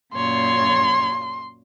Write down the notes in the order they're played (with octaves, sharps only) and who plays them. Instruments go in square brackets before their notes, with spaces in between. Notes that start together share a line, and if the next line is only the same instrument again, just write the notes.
[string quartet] F#2 A#2 C#5 [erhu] C6